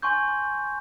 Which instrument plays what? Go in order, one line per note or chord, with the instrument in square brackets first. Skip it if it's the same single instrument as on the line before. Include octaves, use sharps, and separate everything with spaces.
[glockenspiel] G#5 C6 C#6 G6